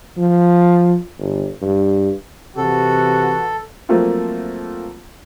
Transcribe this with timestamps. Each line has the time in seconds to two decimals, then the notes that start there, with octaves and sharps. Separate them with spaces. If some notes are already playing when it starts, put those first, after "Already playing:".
0.17 F3
1.19 G1
1.62 G2
2.57 C3 E3 F#4 A4
3.89 F3 F#3 A3 A#3 C4 F4